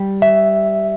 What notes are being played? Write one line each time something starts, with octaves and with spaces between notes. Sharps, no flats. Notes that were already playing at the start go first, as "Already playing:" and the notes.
Already playing: G3
E5